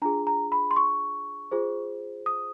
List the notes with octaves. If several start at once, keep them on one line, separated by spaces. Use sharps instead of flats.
D4 F4 G#4 A#5
A#5
B5
C6
C#6
F4 G#4 C5
D#6